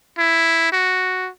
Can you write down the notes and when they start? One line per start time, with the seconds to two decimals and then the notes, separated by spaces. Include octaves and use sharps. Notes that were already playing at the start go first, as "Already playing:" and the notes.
0.18 E4
0.73 F#4